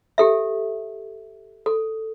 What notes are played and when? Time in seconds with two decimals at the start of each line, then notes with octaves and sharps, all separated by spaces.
0.18 G4 A4 E5
1.66 A4